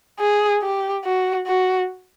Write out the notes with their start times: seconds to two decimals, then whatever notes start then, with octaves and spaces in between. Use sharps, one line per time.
0.20 G#4
0.62 G4
1.04 F#4
1.47 F#4